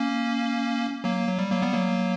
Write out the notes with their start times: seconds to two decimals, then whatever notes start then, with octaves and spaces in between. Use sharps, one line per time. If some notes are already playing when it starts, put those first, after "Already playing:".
Already playing: A#3 C#4
1.04 F#3 A#3
1.28 F#3
1.38 G3
1.51 F#3 A#3
1.62 G3 B3
1.73 F#3 A#3